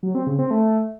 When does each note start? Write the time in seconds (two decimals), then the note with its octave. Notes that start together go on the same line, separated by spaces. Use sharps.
0.03 F#3
0.15 C4
0.27 C#3
0.39 C4
0.51 A3